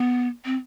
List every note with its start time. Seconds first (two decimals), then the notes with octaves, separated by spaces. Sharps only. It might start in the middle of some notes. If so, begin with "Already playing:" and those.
Already playing: B3
0.45 C4